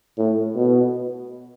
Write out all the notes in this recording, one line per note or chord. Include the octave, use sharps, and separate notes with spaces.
A2
B2